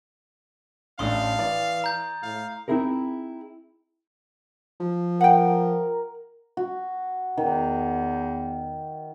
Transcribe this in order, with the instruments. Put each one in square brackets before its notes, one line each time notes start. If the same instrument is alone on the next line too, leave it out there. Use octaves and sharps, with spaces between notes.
[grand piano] A1 A3 D4 [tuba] C#4 [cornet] F5 [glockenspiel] C6 D#6
[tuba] E3 [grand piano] D5
[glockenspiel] A#5 G6
[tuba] A2 [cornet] F5
[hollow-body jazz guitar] C4 D#4 E4 G#4 A#4
[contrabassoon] F3
[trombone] A#4 [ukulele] F#5 G5
[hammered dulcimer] F#4
[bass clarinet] E2 [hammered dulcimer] D#3